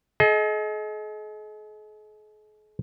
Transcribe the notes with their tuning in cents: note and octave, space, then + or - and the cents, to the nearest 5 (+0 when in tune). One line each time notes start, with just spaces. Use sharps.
G#4 +45 D#5 +15